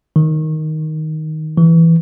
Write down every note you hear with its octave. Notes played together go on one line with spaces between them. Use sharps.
D#3
E3